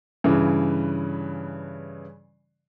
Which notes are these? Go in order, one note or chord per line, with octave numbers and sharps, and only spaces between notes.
G2 C#3 E3